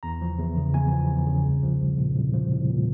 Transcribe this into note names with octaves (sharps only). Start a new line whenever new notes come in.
E2 A#5
F3
E2
C#3
E2 G#5
F3
E2
C#3
C2
F3
C2
A#2
C2
F3
C2
A#2